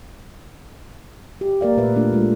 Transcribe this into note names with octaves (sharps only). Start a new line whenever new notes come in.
G4
A#3 A#4 D5 F5
A#2 A3 A#4 B4 E5
A3 D4 F4 A#4
G#3 F4